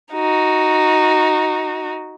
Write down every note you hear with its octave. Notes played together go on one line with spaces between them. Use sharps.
D#4 F#4